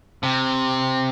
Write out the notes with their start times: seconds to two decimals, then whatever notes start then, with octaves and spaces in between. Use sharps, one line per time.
0.23 C3